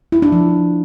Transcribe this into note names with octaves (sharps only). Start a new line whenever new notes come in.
E4
D4
F3